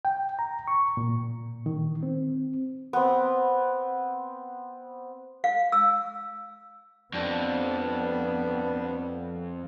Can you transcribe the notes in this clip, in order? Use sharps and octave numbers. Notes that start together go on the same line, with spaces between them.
G5
A#5
C#6
A#2
D#3
C4
B3 C4
F5
E6
F2 G3 B3 D4